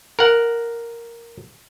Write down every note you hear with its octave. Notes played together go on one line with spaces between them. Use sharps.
A#4 F#5